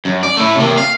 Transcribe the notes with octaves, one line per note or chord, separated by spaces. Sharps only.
F#2
D5
A2 A3
C3 A#3
F5